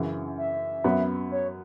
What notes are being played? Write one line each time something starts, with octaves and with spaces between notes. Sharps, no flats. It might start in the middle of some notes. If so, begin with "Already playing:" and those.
Already playing: F#2 C#3 E3
E5
F#2 F#3 B3
C#5